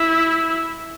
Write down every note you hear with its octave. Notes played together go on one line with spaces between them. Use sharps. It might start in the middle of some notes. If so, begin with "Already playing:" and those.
Already playing: E4